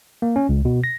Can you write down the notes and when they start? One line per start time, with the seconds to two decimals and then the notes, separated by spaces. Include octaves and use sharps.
0.22 A#3
0.36 C#4
0.49 C#2
0.65 B2
0.84 A#6